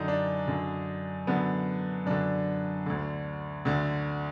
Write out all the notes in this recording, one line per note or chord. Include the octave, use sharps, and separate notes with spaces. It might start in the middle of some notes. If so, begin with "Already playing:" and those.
Already playing: F#2 D3 D#4
D4
F#2 D3
F#2 D3 B3
F#2 D3 D4
D2 D3
D2 D3